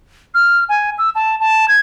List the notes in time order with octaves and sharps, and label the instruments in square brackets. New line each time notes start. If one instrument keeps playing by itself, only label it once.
[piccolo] F6
G#5
E6
A5
A5
G#6